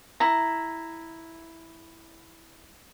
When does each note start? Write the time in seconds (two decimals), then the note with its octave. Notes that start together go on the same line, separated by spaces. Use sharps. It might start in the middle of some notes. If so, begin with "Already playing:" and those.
0.20 E4 A#5